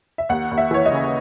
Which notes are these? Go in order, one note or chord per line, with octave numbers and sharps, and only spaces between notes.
E5
D#2 F#5
D#2
E5
E3 C#5
D#5
C#3